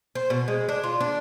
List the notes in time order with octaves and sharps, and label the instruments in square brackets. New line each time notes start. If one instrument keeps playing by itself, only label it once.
[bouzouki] C5
B2
G#3
D4
F4
D4